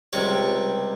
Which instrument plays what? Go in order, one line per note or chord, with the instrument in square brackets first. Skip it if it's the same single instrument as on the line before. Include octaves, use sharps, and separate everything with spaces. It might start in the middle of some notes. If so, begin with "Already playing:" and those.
[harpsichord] C#2 C3 G3 C#5